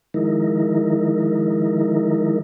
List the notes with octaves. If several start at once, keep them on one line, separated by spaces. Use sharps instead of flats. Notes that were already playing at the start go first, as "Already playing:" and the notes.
D#3 F3 G#3 D#4 E4 A#4